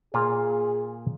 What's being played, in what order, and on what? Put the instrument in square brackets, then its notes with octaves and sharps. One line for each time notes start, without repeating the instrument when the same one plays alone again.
[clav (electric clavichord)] A#2 A#3 F4 [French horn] G#4